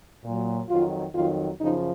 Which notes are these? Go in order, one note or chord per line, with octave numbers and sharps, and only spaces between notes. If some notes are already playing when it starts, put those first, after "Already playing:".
A#2 F#3
F2 D#3 F#3 F4
F2 D#3 F#3 F4
F#2 C#3 F3 D#4